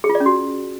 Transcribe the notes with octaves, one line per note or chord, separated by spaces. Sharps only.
G#4
F4
D5
C#4
F#4